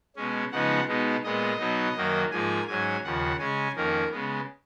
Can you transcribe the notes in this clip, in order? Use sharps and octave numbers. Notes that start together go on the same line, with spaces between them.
B2 G#3 C#4
C#3 F3 G#3 B3 D#4 F#5
B2 G#3 B3 D#4
A#2 G#3 B3 D#5
B2 F#3 B3 D#4
F#2 D#3 F#3 A#3 D#4
G#2 F3 A#3 G#5
G#2 F#3 C#4 G#5
D#2 C#3 F3 F#5
C#3 G#3 C#4 G#5
F2 D#3 A#3 C#4 A#4
C#3 G#3 B3